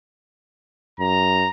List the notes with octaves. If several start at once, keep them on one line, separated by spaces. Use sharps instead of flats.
F#2 A#5